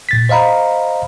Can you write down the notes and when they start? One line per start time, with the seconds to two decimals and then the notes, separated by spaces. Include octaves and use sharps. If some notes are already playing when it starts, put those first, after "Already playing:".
0.09 A#2 A6 B6
0.29 C5 D#5 F5 A#5 B5